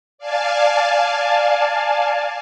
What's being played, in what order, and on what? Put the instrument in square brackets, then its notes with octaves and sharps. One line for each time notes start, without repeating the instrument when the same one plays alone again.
[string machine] D5 F5 G#5 A5